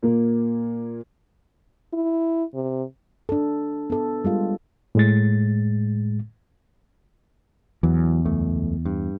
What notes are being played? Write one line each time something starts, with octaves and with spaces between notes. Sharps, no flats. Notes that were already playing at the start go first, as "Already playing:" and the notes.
A#2 A#3
E4
C3
D4 A4
B3 A4
G3 G#3 F4
A2 G#3 A6
E2 E3 F#3
C#2 F#2 A3
G2